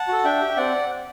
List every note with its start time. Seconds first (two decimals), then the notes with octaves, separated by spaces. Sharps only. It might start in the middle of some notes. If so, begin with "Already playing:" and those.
Already playing: F#5 A5
0.08 F#4 A4
0.24 D4 E5 G5
0.41 G4
0.56 C4 D5 F#5